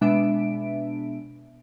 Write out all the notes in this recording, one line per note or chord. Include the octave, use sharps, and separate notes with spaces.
B2 G#3 B3 D4 E5 D7